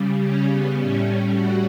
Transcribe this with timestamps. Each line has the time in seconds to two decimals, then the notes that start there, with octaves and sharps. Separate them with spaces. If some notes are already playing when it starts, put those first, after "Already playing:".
Already playing: C#3 G3
0.22 C#4
0.51 B3
0.78 A2 G3 C#4
1.35 F#4